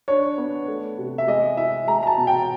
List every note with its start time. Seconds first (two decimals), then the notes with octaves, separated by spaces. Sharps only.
0.08 D4 C#5
0.38 B3
0.68 A3
0.98 C3
1.18 E5
1.28 G#3 D#5
1.57 E4 E5
1.87 G#3 A#5
2.03 A#5
2.07 A5
2.18 B2
2.27 G5